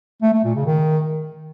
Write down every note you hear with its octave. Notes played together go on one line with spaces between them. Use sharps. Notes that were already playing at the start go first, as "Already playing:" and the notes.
A3
A3
A#2
C#3
D#3